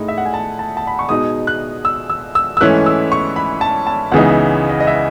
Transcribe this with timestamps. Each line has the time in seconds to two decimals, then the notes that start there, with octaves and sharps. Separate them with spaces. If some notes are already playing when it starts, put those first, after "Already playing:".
Already playing: A2 G#3 D#4
0.08 E5
0.18 F#5
0.25 G#5
0.34 A5
0.59 A5
0.77 A5
0.87 B5
0.99 C#6
1.09 B2 G#3 D#4 D#6
1.47 F#6
1.85 E6
2.10 E6
2.35 E6
2.57 E6
2.61 G#2 E3 A3 C#4 E4 F#6
2.86 E6
3.12 C#6
3.36 B5
3.61 A5
3.87 A5
4.12 C#2 C#3 E3 B3 D#4 F#5
4.31 E5
4.69 D#5
4.80 D#5
4.87 E5